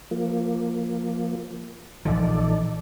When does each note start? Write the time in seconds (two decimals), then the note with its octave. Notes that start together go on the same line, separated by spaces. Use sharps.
0.11 F3 A#3
2.05 A#1 E3 F3 D#4 A4 D5